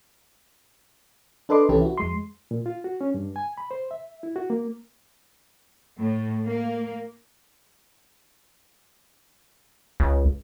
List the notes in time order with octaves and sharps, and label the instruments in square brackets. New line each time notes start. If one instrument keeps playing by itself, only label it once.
[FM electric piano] D4 A4 B4 D#5 C6 D6
C2 E3 C#4 G4 A4 B4
E4 F#4
F2 G#3 C6
[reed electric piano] A#2
F4
F#4
C#4
G2
G#5
B5
C5
E5
E4
F#4
A#3
[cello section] A2
A#3
[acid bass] C#2